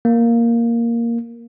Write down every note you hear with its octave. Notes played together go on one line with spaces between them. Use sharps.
A#3